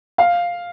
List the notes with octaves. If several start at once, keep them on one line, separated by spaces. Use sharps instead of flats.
F5